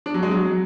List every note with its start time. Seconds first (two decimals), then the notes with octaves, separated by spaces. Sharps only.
0.06 D4
0.14 F#3
0.23 G#3
0.31 F#3